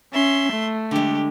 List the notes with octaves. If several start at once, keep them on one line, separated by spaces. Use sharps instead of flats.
C#4 E5 C6
A3
D3 G#3 G4